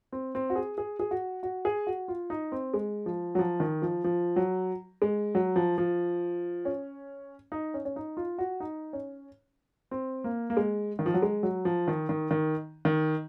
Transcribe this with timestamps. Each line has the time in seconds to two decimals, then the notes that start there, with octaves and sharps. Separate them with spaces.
0.12 C4
0.35 C4
0.50 F#4
0.55 G#4
0.78 G#4
1.00 G#4
1.11 F#4
1.43 F#4
1.65 G#4
1.87 F#4
2.08 F4
2.30 D#4
2.52 C4
2.74 G#3
3.06 F3
3.35 F#3
3.39 F3
3.60 D#3
3.82 F3
4.04 F3
4.36 F#3
5.02 G#3
5.35 F#3
5.56 F3
5.78 F3
6.65 C#4
7.52 D#4
7.74 C#4
7.85 C#4
7.96 D#4
8.17 F4
8.38 F#4
8.60 D#4
8.93 C#4
9.91 C4
10.24 A#3
10.50 A#3
10.57 G#3
10.99 D#3
11.06 F3
11.14 F#3
11.22 G#3
11.43 F#3
11.65 F3
11.88 D#3
12.09 D#3
12.31 D#3
12.85 D#3